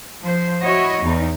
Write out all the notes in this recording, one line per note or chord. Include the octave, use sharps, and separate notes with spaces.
F3 C5
E4 F#4 C#5 D#5
E2 D#4